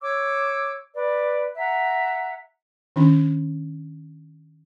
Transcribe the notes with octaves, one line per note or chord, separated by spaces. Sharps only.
C#5 D6 E6
B4 D5
E5 F#5 A#5
D#3 C#4 D4